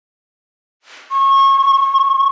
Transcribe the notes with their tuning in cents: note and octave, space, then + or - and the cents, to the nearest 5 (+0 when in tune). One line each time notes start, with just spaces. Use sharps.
C#6 -25